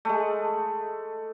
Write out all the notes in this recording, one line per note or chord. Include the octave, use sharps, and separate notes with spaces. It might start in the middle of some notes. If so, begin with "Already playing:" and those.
G#3 A3